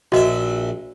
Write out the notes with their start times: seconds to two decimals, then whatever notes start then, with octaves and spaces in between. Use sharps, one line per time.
0.12 A#1 F#4 D#5 E5